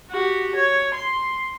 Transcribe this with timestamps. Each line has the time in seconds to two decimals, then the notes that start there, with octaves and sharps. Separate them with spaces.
0.11 F#4 G4
0.55 C#5
0.94 C6